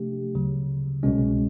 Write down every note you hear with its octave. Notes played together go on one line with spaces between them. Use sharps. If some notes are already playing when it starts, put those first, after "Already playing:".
Already playing: C3 F3 A3 D4 G4
D2 C#3 F#3
C2 B2 G#3 C#4